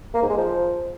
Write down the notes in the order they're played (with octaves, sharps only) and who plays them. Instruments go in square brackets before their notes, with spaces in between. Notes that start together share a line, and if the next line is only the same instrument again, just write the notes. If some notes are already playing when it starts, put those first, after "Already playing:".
[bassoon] A#3
G#2
G#3
F3